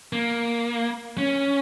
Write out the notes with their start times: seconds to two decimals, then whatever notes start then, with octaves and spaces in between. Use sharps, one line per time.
0.13 A#3
1.18 C#4